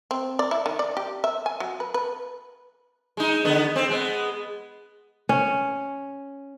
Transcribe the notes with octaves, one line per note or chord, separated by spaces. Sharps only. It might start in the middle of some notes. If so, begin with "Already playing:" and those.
C4
D5
E4
D#3
D5
G4
E5
G#5
F#3
B4
B4
G#3 D#4
D3 B3
C4
G#3 B3
C#4